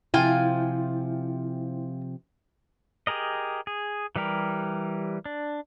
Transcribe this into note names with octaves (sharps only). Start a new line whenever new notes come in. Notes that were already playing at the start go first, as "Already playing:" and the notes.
C3 F3 E4 F4 G5 G#5
G4 G#4 A#4 D#5
G#4
E3 G3 G4 A#4
D4